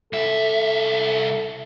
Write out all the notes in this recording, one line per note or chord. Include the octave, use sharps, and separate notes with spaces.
C2 A4 E5